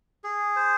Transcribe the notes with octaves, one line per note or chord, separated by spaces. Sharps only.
G#4
C5